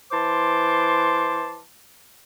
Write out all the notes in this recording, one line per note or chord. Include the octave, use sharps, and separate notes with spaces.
E3 C5 A5 C6 D6